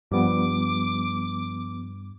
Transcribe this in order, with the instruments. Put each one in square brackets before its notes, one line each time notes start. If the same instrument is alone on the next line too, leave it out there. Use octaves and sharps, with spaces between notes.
[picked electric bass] G2 [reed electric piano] F3 G3 B3 [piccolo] D6